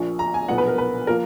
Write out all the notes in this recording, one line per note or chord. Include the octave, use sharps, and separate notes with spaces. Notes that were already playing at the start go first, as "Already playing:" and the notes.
Already playing: A#1 A#2 F3 C#6
A#5
G#5
B1 A#2 F3 B3 F#5
B4
A#4
B4
F3 A#3 A#4